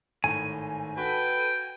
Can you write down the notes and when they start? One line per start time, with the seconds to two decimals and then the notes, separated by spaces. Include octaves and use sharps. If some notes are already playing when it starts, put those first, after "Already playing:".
0.24 G#1 A2 G#5
0.97 F#4 A4 B4 G5